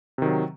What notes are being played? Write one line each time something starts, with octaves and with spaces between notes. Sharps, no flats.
C3 D#3 F#3